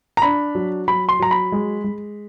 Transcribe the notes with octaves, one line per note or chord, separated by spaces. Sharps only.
A#5
D4 B5
F#3
F#3 B5
C6
F#3 A#5
B5
G#3
G#3